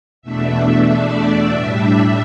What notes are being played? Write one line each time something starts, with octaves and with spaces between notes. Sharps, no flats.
E2 B2 A3 D4 E5
E5
D5
A2 G3 D4 E5